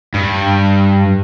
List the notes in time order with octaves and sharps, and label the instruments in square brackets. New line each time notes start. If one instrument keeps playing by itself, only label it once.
[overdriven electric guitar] G2